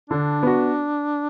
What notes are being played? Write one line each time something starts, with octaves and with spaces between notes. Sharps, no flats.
D3 D4
B3 F#4